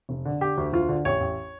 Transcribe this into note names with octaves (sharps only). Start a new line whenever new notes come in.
F1
D3
D3 G4
D2
D2 F4
D3
A1 C#5
A1